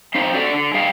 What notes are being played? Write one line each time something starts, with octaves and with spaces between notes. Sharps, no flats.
C4 D#4 C5 F5
F#4 A4 D5
D3
G3 G#4 F5 G5